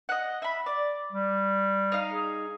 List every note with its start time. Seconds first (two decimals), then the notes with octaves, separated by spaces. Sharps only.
0.09 D#5 F#5
0.42 E5 B5
0.66 D5
1.12 G3
1.92 D#4 F5
2.13 G#4